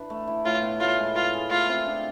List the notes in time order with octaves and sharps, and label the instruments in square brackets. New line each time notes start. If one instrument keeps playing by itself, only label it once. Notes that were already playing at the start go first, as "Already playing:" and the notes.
Already playing: [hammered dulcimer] E3 D4 B4
A3
E4
[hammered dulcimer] A2 [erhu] F4
[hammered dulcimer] B3
[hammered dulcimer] A2 [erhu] F4
[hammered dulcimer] G#3
[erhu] F4 [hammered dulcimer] B4
[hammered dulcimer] G#4
[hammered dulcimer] A3 [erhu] F4
[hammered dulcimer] C4
D4